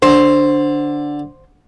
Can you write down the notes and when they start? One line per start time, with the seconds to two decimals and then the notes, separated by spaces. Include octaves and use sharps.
0.02 D3 C5